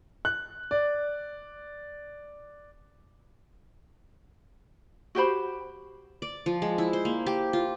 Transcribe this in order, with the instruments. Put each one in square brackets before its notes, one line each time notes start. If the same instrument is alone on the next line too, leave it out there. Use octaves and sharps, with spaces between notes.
[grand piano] F#6
D5
[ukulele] F#4 G4 C5 B5
[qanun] D5
F3
G#3
E4
C5
A#3
G4
F4